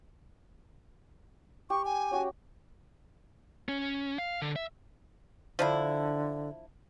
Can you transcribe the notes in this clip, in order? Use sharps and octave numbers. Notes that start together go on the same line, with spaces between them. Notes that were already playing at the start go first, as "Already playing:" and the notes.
G4 C#6
G#5
C#4 F#4 G4
C#4
F5
D3
E5
D3 F3 D4 E4